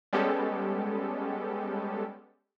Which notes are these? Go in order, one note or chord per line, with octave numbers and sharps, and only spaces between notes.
G3 G#3 B3 C#4 G4 A4